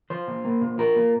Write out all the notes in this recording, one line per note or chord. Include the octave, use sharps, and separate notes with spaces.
F3 C5
A#2
A#3
A#2
F3 A#4
A#2